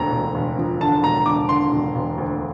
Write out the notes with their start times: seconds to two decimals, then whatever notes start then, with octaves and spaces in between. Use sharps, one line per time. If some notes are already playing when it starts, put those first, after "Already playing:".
Already playing: E1 D2 A#5
0.12 E1
0.35 E1
0.59 F3
0.80 D3 A5
1.03 E1 A#5
1.26 E1 D6
1.49 D3 C6
1.72 E1
1.95 E1
2.18 D2